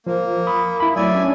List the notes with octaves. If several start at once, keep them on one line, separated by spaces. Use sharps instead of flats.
F3 A#3
B5 D#6
E4 B5
F#3 A3 D5 E5 G#5
C#4 D4